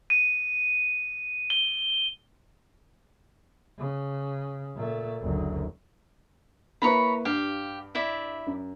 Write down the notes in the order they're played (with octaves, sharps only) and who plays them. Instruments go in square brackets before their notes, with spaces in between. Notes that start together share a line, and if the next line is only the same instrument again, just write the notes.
[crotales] D#7
G7
[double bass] C#3
A#2 A3
F#1 D2
[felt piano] A#3 E4 B4 [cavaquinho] C#5 A#5 B5
[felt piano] G2 [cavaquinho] G4 F5
[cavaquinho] E4 D5 E5
[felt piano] F#2